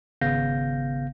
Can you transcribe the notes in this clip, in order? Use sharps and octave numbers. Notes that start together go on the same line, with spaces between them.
G#1 C#3 B3 F5 G6 A#6